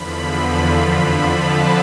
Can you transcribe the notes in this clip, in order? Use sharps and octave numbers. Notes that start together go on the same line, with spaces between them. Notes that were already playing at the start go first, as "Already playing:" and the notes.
Already playing: E2 D3 F3 B5
B5
F2 D3 F3 B5
A5